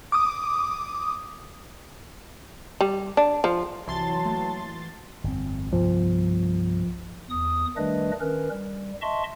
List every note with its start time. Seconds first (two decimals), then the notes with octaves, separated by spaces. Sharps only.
0.12 D6 D#6
2.81 G3
3.17 D4
3.44 F3
3.88 C2 E3 F#3 A5 C6 A6
4.25 A3 A#3
5.24 G1 F2 C4
5.73 C2 G2 F3 B3
7.30 E2 D#6
7.77 D#3 G3 A3 D4 B4 D#5
8.20 D#3 C#4 A#4 B4
8.50 G3
9.02 D#5 E5 A5 C6 C#6